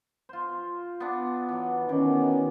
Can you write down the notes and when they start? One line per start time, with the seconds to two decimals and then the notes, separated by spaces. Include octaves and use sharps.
0.29 F4 C5
1.00 B3 D4
1.49 E3 F#3
1.89 B2 D#3 C#4 D6